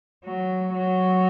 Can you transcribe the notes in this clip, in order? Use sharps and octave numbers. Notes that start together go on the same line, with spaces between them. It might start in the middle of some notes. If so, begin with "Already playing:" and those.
F#3
F#3